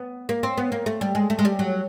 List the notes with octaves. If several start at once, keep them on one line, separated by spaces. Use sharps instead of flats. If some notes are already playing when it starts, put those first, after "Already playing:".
Already playing: B3
A#3
C4
B3
A#3
A3
G3
G#3
A3
G#3
G3
F#3